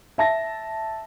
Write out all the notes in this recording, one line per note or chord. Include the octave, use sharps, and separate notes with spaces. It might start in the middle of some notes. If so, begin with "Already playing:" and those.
E5 A5 A#6